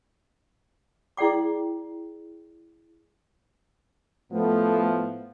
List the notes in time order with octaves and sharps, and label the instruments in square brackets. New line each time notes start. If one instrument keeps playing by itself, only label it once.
[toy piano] E4 G#4 D5 G5 D6
[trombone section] A2 F3 B3 [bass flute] A3